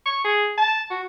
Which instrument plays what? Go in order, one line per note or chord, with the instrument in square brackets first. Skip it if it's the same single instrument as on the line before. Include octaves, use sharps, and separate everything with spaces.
[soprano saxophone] C#6
G#4
A5
F#4